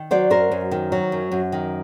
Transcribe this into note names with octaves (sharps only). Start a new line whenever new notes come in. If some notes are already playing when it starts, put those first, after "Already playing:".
Already playing: D#3
F#3 C5 D5
F#2 A#4 C5
F#2
D#3
F#3
F#2
F#2
D#3